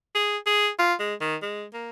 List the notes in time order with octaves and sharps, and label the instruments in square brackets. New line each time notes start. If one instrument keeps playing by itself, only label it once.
[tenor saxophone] G#4
G#4
F4
G#3
D#3
G#3
A#3